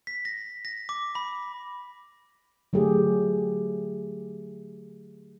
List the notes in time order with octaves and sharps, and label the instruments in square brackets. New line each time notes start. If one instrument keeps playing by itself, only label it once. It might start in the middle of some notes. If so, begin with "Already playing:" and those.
[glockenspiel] B6
A#6
A#6
D6
B5
[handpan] D3 F#3 A3 G4 G#4